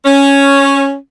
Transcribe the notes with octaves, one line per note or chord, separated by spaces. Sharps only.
C#4